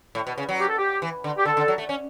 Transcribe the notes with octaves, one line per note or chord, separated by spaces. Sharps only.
A2
B2
C#3
F#3
G4
A4
G4
E3
D3
G4
D3 A4
D3
F#3
A3
C#4